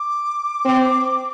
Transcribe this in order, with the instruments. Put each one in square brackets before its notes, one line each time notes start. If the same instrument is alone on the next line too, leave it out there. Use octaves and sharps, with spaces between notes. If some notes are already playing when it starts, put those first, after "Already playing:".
Already playing: [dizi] D6
[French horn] C4